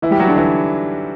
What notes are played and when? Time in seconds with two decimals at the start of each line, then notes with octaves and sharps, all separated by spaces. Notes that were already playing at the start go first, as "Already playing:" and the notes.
0.02 E3 E4
0.11 G3 G4
0.19 F#3 F#4
0.28 D3 D4
0.37 E3 E4